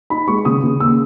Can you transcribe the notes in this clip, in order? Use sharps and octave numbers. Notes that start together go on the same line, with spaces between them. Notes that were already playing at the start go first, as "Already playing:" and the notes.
D#4 B5
G#3 C#6
C#3 D#6
C#3
D#2 E6